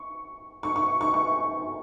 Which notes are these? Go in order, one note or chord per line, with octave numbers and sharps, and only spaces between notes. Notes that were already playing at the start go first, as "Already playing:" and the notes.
Already playing: C#6
C#6
C#6
C#6
C#6